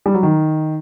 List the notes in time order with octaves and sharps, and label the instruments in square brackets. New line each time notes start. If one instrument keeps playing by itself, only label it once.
[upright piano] G3
F#3
D#3